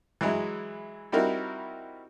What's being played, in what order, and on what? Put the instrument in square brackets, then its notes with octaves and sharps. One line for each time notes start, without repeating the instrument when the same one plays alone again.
[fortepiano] E3 F#3 G#3 E4
G3 C4 D#4 E4 F#4 A#4